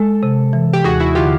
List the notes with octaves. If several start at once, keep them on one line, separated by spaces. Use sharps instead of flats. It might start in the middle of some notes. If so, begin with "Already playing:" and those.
Already playing: G#3 A4
C3
E3
G4
D#2 F#4 G#4
E4 F#4
D3 F4 G4